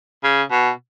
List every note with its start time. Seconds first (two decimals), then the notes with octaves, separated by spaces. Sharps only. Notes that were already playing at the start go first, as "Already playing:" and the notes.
0.24 C#3
0.51 B2